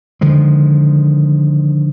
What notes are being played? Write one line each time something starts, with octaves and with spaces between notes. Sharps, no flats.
D3 D#3 F3 G#3